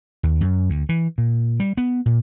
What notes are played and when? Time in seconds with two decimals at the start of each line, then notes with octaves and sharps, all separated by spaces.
0.23 D#2
0.41 F#2
0.70 D2
0.89 E3
1.18 A#2
1.60 G3
1.77 B3
2.06 A#2